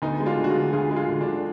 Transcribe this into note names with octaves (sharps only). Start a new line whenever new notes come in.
D2 B3 D#4
G#3
D4 F4
D2
F#4
F4 G#4
D3
D2 F4 G#4
G#3
F4 G#4
D2
D3 D4 F4